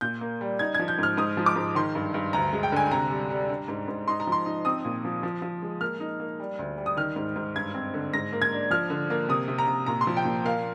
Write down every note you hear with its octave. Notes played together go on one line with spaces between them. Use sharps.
A#2 G6
A#3
G3
D#4 G#6
F3 G#6
G6
G#2 F6
G#2 D#6
F3
D6
G#2
D#3 C6
G2
G2
D2 A#5
G#3
G5
D3 G#5
C3 A#5
G3
G3
D4
G#2
G#2
D#4 C6
A#5
F3
C6
D#4
C4 D#6
A#2
F3
F3
F3
G#3
A#3 F6
D#4
A#3
G3
D2
G3
D#6
D#3 F6
G#2
G#2
G2 G#6
C4
D3
G#2 A#6
A#3
G#6
D4
F3 F6
D3
A#3
C3 D#6
C3
A#5
C3
A#2 A#5
C6
F3
G5
A#2
A#3 F5